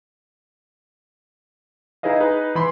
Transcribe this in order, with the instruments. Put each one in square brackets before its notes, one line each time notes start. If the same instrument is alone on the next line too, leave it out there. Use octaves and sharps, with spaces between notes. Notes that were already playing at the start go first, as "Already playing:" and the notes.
[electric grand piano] D#4 E4 G#4 B4 D#5 F5
D#4 G#4 B4
E3 B5 C6